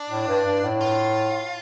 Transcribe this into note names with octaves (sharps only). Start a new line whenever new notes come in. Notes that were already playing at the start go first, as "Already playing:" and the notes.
Already playing: D4
A2
G2
G2
A2
F4